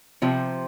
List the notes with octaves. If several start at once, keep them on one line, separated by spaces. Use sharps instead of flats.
C3 F3